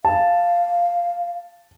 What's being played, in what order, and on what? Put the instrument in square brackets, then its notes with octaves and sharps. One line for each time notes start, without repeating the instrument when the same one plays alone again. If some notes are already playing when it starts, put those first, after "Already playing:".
[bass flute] F5 [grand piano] A5